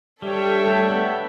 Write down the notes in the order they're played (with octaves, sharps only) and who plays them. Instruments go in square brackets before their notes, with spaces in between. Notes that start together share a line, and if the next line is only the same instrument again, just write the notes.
[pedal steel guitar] G3 [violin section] D4 A4 C#5 E5 G5
[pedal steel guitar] A3
B3